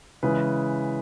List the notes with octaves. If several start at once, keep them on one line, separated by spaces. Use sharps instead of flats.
C#3 E3 G#3 B4